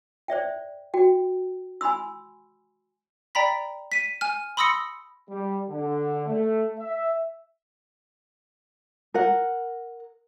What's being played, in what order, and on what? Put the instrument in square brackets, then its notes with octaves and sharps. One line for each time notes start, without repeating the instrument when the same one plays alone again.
[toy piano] C5 D5 E5 G5
F#4 G5
G#5 B5 C6 E6
[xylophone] D5 G5 A#5 B5 B6
B6 D#7
G#5 F6
B5 C6 D#6 E6 A#6 C#7
[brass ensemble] G3
D3
A3
E5
[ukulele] A#4 F#5